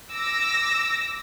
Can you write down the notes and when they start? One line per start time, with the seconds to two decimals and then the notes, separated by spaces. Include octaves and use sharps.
0.11 D6 E6 A#6